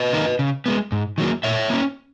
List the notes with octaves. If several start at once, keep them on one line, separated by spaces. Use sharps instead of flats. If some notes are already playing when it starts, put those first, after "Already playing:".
Already playing: B4 D#5
D#3 A#3 D#4
C#3
G#3 B3
G#2
D#3 F#3 A#3
A#2 C#5 E5
A#3 C#4